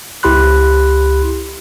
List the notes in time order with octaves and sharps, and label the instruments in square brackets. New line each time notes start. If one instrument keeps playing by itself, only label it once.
[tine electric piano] C#2 E4 G4 B5 C6 F#6